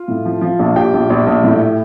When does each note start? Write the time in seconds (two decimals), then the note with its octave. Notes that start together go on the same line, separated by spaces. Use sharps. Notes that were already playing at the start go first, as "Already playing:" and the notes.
Already playing: F4
0.08 A2
0.25 F3
0.41 F3
0.59 A#1
0.76 A#1 G4 G5
0.93 A#1
1.10 A#1
1.26 A#1
1.44 A2